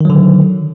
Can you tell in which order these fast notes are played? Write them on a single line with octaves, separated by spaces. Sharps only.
D#3 F#3 D3